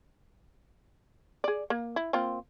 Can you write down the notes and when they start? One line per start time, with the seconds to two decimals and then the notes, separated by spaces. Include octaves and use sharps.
1.44 G#4 D5
1.70 A#3
1.96 E4
2.13 A#3 C4 F4